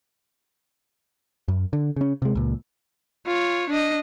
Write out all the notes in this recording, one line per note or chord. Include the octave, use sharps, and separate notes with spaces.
F#2
D3
C#3 C#4
C3 G#3
C#2 A#2
F4 C#5
D4 D#5